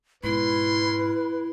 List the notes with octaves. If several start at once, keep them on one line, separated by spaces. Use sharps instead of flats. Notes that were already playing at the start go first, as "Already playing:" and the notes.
G#2 B2 C#4 E4 B4 C6